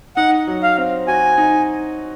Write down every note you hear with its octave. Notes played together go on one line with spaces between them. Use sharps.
D#4 F#5
F#3
F5
C4
F#4 G#5
D#4